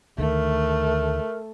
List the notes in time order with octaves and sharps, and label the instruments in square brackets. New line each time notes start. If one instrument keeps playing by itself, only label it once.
[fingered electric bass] D2 D#3 [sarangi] A3 [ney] A#4